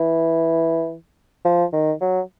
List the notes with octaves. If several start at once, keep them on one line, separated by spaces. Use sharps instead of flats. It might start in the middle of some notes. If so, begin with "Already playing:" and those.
Already playing: E3
F3
D#3
F#3